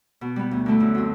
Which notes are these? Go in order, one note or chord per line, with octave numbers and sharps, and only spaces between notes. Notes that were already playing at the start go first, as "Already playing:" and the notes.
B2
G3 B3
D2
D3 A3 E4
F#2
F#3 C4